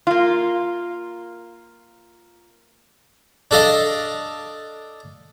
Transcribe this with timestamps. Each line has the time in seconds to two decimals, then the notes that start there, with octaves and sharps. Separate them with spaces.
0.07 A#3 F4
3.51 D4 A4 D#5 F5